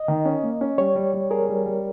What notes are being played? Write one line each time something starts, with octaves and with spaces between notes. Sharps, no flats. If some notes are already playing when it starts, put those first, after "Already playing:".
Already playing: D#5
D#3
C#4
A#3
C#4
G3 C#5
G3
G3
G#4 A#4
G3
G3